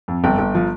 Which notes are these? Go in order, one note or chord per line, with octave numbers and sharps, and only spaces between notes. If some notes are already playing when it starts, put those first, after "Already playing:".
F2
G1 G5
G1
F3